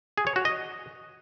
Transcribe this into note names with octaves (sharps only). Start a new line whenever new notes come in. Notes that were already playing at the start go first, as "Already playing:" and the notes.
G#4
C#5
F#4
D#5